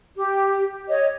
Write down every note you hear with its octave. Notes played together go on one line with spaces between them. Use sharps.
G4
C#5 D#5